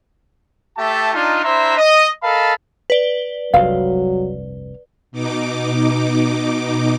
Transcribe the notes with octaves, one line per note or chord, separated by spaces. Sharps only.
A3 G4 E5 A5
D4 D#4 F4
D4 E4 C5 E5 A#5 C6
D#5
A4 A#4 D#5 F5 A5 B5
B4 D5 G7
F1 C2 G2 F#3 F5
B2 D#4 D6